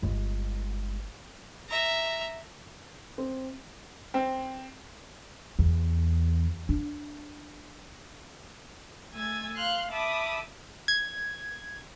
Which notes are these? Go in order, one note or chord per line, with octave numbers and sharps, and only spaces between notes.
G1 G#3
E5 A#5
C4
C4
E2
D4
A3 G#5 E6 G#6 A6
F5 C6 F6 F#6
E5 A5 B5 D6 D#6
G#6